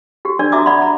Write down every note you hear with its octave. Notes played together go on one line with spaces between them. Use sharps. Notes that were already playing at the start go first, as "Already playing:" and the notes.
F#4 G4
D4 A#4 D5
F#4 E5 A#5 D6 D#6
D5 F#5 B5 C6
A#5